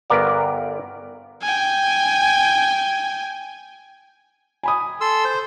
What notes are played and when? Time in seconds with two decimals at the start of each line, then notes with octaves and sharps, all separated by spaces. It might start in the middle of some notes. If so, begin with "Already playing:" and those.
0.10 G1 B3 A#4 D5 F5
1.42 G5 G#5
4.63 G#5 B5 D#6
5.01 A4 C6 E6
5.25 C5